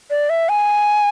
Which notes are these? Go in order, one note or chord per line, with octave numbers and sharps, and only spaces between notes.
D5
E5
G#5